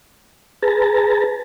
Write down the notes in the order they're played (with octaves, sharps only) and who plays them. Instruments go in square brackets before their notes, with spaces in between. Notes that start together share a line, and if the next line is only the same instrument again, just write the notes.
[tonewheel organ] G#4 B4 A5 A#5